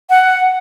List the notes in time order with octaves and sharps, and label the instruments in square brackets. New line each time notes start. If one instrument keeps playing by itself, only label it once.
[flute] F#5